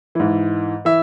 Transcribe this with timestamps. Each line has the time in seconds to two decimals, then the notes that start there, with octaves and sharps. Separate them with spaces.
0.15 G#2 E3
0.85 E3 E5